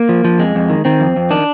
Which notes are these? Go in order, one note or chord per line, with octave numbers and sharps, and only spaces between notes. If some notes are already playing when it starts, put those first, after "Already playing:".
Already playing: A#3
F3
F3
F2 G#3
F2
D#3
D#3 C4
F2
F2
D#3 D4